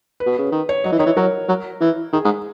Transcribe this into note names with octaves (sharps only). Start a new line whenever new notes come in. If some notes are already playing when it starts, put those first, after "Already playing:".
B4
B2
C#3
D#3
C#5
F#3 D#5
E3
D#3 C#5
E3
F#3 A#4
F#3
E3
D#3 G#4
G#2